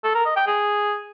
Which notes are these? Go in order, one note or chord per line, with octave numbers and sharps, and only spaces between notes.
A4
A#4
D#5
G5
G#4